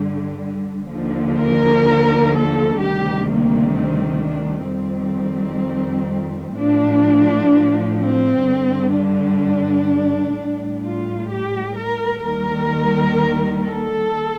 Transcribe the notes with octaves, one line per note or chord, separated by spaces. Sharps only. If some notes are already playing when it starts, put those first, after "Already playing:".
Already playing: G2 D3 G3
D#2 D3 F3
A#4
A4
D2 C3 D#3 G3 G4
A#3
C4
D4
F2 D#3 G3 C4
A2 F3 D4
C4
G2 D3 G3
D4
A2 G3
F4
G4
A#4
D#2 D#3 G3 A#4
A4